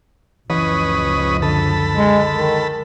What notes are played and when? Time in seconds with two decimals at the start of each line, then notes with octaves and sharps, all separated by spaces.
0.50 F#1 C#2 E3 F3 C#4 B4 D#5
1.42 D3 A4 B5
1.95 G#3
2.32 D#3